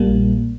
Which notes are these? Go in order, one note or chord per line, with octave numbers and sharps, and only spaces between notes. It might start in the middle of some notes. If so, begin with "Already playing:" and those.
Already playing: A#1 A#2 G3 A#3